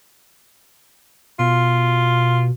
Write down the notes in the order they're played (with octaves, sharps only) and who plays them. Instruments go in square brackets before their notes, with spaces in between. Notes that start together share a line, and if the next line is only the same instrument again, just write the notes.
[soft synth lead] B2 [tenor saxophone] F4